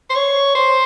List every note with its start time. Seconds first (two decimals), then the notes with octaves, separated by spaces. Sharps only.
0.10 C5
0.16 C#5
0.55 C5